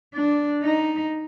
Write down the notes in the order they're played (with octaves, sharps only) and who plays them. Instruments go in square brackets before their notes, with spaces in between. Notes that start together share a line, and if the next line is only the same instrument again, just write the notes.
[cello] D4
D#4